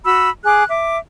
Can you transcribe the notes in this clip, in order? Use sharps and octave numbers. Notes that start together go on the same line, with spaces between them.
F#4 B5 E6
G#4 D6 F#6
E5 D6